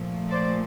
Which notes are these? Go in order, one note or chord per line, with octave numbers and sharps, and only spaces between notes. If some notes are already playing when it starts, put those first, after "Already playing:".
Already playing: A#2 F3 A3
C5 D5